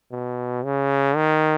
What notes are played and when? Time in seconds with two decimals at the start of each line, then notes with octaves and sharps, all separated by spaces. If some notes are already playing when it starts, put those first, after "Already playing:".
0.12 B2
0.64 C#3
1.16 D#3